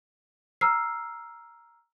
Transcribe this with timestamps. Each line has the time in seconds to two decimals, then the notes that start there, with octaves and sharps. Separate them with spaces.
0.61 A#5 E6 F6 C7